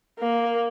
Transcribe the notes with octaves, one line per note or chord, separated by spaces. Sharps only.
A#3